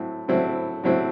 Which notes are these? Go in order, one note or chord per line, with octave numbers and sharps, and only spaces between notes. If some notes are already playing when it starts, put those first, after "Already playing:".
Already playing: A2 F#3 C4 E4
A2 F#3 C4 E4
A2 F#3 C4 E4